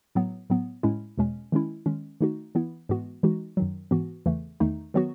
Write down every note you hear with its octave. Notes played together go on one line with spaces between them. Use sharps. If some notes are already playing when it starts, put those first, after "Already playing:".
A2 F#3 B3
A2 F#3 B3
A2 G#3 C#4 E4
E2 B2 G#3 C#4
D#3 G#3 C#4 E4
D#3 G#3 C#4
D#3 A3 D#4 F#4
E3 B3 E4
G#2 E3 G#3 B3 F#4
E3 G#3 D#4 F#4
F#2 D#3 F#3
G#2 E3 B3 F#4
E2 C#3 E3 A3
E2 D#3 A3 D#4
D#3 F#3 B3 F#4